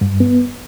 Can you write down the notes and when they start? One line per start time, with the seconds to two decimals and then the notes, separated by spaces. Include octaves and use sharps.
0.01 G2
0.20 B3